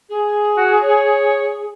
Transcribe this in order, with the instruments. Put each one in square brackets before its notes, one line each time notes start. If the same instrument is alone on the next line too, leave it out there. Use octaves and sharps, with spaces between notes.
[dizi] G#4
[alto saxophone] F#4
C#5